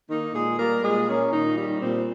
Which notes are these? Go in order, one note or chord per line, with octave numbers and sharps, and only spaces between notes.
D#3 A#3 D#4
A#2 G#3 G#4
G3 A#3 A#4
A#2 G#3 G#4
A#3 C#4
A#2 D#3 D#4
D#3 G3 D#4
A#2 C4